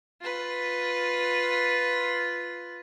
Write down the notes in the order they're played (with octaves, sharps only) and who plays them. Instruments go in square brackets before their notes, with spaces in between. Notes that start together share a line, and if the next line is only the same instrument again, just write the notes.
[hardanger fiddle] F4 B4